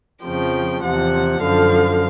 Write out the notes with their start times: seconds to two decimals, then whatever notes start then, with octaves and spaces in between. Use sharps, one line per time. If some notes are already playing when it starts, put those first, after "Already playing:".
0.23 F2 C#3 F3 G5
0.83 E2 C3 F3 F#5
1.42 F#2 D3 F3 F5